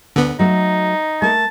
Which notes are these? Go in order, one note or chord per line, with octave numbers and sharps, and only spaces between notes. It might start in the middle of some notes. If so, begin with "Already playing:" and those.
D2 D3 B3
F#3 A3 D#4
A3 A#4 A5